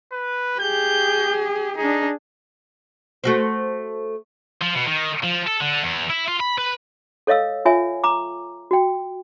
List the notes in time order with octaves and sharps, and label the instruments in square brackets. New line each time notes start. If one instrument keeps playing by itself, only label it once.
[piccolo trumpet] B4
[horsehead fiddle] G4 G#4 [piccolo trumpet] G6
[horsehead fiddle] D4 G#4 [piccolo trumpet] D#4
[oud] A3 F#4 C5
[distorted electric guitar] F3
B2
D#3
F3
A4
D3
E2
E4
F4
B5
B4
[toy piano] A4 C#5 D#5 F5 E6
F4 C#5 E5 G#5
A#5 D6
F#4 G5